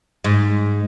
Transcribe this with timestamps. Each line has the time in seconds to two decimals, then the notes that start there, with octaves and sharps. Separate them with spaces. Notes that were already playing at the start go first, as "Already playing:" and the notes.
0.24 G#2